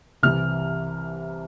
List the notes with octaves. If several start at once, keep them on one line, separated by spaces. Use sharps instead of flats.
C2 C3 E3 F6